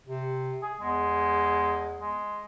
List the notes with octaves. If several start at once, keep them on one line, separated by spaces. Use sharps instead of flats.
C3
G#4
E2 G#3
G#3